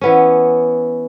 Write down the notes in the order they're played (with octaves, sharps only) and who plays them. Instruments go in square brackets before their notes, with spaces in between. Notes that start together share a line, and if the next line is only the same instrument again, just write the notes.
[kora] E3 B3 C#4